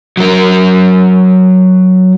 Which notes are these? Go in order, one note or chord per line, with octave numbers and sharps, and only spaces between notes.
F#3 A#4